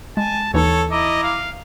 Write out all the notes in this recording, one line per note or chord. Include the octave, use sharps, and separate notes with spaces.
G#3 G#5 A5
D#2 E3 D#4 A4 C#5
E4 D#5 A#5 D6
F5